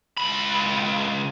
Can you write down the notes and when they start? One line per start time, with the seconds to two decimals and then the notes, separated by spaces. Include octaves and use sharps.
0.18 C#2 B5